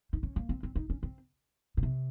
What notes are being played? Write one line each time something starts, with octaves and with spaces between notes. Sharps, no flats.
D#4
C#4
A#3
C4
C4
D#4
C#4
C4
A#2
C3